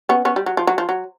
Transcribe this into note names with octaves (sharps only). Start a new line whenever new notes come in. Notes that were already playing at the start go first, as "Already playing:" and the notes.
B3 C#4
B3 C#4
G3
F#3
F3
F#3
F3
F#3